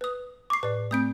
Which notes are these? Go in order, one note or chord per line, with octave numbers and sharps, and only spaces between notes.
B4 D#6
C#6 D6 C7
A2 B4 D5
A3 C4 D#6 G6 D7